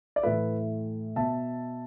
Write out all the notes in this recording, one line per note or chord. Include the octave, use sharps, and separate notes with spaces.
D5
A2 E3 A3 B4 E5
B2 B3 E5 A5